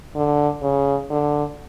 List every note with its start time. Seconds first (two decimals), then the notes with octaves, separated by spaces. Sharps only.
0.15 D3
0.62 C#3
1.11 D3